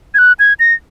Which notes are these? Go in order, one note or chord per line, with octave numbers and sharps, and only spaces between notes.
G#6
F#6
G#6
A#6